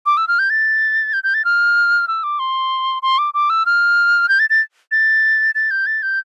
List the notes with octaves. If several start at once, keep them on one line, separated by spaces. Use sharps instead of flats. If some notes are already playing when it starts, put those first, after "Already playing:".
D6
E6
F6
G6
A6
G6
G6
A6
F6
E6
D6
C6
C6
D6
D6
E6
F6
G6
A6
A6
A6
A6
G6
A6
G6